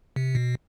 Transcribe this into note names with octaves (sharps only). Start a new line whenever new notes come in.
C3
B2